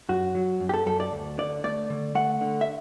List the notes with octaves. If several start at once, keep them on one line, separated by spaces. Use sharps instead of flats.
F#2 F#4
F#3
F#2
G4
A4
F#2 A4
D5
D2
D3 D5
A3 D5
D3
A3 F#5
D3
E5